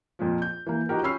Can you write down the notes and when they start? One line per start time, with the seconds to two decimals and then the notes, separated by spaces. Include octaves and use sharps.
0.19 F2 A#2 F3
0.42 G6
0.67 E3 A#3
0.89 F3 D#4 F#4 G4 A#4
1.03 C#4 F4 B5 E6 F6 C7